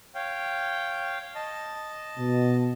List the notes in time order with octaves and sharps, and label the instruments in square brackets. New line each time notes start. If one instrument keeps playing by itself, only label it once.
[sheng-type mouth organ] C#5 F5 G5
D#5 A5
[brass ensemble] B2